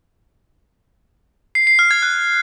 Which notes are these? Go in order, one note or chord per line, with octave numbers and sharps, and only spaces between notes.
C7
C7
F6
G#6
F#6